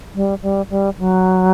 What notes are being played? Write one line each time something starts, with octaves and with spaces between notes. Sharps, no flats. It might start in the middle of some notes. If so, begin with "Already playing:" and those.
G3
G3
G3
F#3